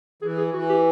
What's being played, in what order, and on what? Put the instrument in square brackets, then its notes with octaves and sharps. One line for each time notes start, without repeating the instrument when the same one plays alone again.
[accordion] E3 [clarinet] G#4
[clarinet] G#4
[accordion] E3 [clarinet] F#4
[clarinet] G4